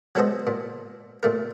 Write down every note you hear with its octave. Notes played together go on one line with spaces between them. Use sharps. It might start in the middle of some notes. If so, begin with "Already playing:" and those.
F#3 G#3 B3 A4 C5 D#5
A#2
A#2 A3 A#4